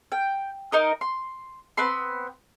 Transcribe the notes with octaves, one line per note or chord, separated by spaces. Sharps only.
G5
D#4 A#4 D#5
C6
B3 C4 B5 C6